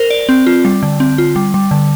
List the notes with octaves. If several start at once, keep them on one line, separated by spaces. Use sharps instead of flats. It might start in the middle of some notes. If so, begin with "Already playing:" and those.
Already playing: A#4 C5
D5
C4
F4
G3
D3
C4
F4
G3
G3
D3